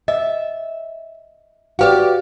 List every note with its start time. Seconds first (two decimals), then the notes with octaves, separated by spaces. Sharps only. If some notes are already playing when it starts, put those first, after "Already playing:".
0.08 D#5 E5
1.79 F#4 G4 B4 D5 F5